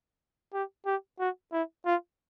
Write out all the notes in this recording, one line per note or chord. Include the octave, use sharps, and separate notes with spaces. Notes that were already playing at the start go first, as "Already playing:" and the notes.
G4
G4
F#4
E4
F4